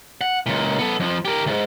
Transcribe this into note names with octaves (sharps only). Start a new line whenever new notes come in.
F#5
C#2 A#2
B3 A4
F2 F3
G4 A#4
D2 G#2